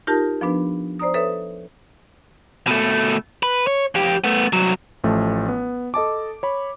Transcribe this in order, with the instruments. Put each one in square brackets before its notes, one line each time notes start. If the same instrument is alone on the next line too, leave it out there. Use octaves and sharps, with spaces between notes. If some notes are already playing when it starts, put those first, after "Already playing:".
[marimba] D#4 F4 G4 A#4 A5
F3 B3 D4 B4
C5 D5 A#5 D#6
A4 B4 C#5 E5 D#6
[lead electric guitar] B2 A3
B4
C#5
F2 G4
A3 B3
C2 F#3
[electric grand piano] A1 F3 A3
B3
A4 D#5 A5 D6
C#5 B5